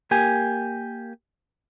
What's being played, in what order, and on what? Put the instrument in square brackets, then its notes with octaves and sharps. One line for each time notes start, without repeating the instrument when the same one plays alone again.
[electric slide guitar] A#3 G4 G#5